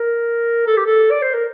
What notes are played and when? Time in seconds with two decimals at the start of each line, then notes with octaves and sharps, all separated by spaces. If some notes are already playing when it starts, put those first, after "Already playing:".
Already playing: A#4
0.67 A4
0.77 G4
0.86 A4
1.11 D5
1.22 C5
1.33 A#4